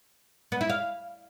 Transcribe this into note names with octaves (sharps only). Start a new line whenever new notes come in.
B3
E4
F5